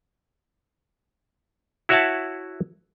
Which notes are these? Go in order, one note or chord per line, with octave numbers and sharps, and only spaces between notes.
E4 F#4 C#5 E5 F#5 A5